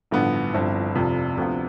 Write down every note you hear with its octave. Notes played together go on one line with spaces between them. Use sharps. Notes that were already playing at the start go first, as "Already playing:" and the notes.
A1 G2 D3 F3 B3
G1 G2 F3 C4 E4
F1 F2 C3 F3
D2 C3 F3 B3 F4